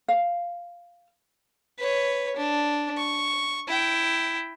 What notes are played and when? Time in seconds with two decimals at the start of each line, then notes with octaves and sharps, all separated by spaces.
0.08 F5
1.79 B4 C#5
2.36 D4
2.97 C#6
3.68 E4 G5